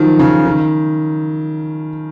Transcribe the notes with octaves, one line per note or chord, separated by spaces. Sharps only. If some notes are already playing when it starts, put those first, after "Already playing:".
Already playing: D#3 F3 F#3
C#3
D#3